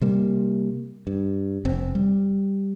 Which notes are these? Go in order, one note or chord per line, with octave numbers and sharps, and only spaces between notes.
C3 G3 A#3
G2
F1 C4
G3